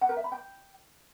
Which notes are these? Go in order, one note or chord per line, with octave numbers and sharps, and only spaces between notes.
F#5
A#4
E5
B5
G5